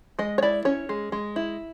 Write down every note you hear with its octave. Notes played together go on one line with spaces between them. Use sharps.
G#3 D#5
C#5
E4 D5
C#4 C#5
G#3
G#3
E4